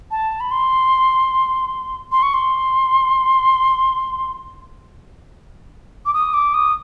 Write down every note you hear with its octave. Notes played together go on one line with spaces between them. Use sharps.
A5
B5
C6
C6
C#6
C6
D6
D#6
D6
D#6